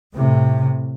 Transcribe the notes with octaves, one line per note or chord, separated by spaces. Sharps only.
A2 C3